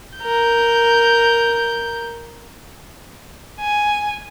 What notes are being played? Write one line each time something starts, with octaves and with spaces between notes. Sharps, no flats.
A#4 G6
G#5